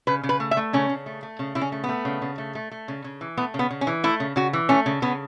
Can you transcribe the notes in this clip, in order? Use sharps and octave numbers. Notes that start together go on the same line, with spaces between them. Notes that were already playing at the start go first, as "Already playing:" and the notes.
C#3 B4
C#3
B4
A3
E5
A3
C#3 C#4
C#3
A3
A3
C#3
C#3 E4
C#4
A3
B3
A3
C#3
C#3
A3
A3
A3
C#3
C#3
E3
A3 B3
C#3
B3
C#3
C#4
E3
A3 E4
C#3
C#3 F#4
E3
A3 C#4
C#3
C#3 B3